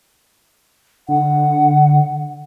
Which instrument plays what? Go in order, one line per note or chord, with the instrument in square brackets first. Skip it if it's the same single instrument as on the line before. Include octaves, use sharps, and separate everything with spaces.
[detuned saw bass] D3 [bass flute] F#5